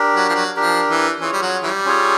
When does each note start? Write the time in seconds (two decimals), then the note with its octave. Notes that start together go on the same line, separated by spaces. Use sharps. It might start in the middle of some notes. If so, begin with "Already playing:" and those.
Already playing: D4 G4 A#4
0.14 F#3
0.29 F3
0.35 F#3
0.56 F3 D4 G4 A#4
0.89 E3
1.20 E3 C#4 F4 G#4 C#5
1.33 G3
1.42 F#3
1.63 E3 G3
1.85 C#4 F4 G#4 C#5